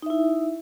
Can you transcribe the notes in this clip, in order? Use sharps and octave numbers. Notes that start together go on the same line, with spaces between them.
D#4 E4 E5